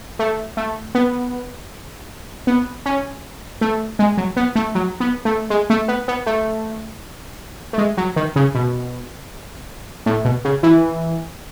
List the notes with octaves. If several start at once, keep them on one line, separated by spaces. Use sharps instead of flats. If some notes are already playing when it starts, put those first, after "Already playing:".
A3
A3
B3
B3
C#4
A3
G#3
F#3
B3
A3
F#3
B3
A3
G#3
A3
B3
B3
A3
A3
G#3
F#3
D#3
C#3
B2
A2
B2
C#3
E3